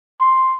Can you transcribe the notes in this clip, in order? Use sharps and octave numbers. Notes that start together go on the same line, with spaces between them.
C6